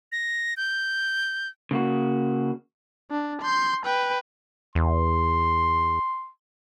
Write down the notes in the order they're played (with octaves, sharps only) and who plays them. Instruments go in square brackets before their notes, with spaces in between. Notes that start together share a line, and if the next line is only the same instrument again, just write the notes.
[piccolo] A#6
G6
[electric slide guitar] C#3 A#3 F#4
[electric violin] D4
C6 G6
B4 G5
[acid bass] E2 [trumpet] C6